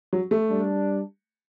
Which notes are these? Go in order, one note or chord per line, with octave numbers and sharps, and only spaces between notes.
F#3
A3
G3 D4